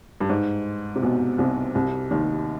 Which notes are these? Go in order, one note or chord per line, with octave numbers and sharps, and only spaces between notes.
G2
G#2
C3
B1 B2
C2 C3
C2 C3
D#2 D#3